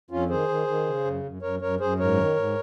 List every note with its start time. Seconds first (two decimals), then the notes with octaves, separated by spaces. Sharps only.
0.10 F2 C#4 F4
0.29 D#3 G#4 C5
0.48 D#3
0.67 D#3
0.86 C#3
1.05 F#2
1.24 F#2
1.42 F#2 A#4 C#5
1.62 F#2 A#4 C#5
1.80 F#2 G#4 C5
1.99 G#2 A#4 C#5
2.17 D#3
2.36 G#2